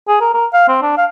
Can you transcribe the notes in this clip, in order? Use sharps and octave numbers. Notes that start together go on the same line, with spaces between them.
G#4
A#4
A#4
F5
C4
D4
F5